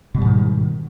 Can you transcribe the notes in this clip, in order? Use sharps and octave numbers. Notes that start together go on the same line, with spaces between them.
G#2 B2 D#3 G3